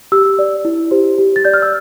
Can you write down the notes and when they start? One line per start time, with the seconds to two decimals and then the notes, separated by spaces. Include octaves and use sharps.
0.12 G4 E6
0.39 D5
0.65 E4
0.91 G4 C5
1.18 G4
1.36 A6
1.45 D5 G6
1.54 F6
1.62 E6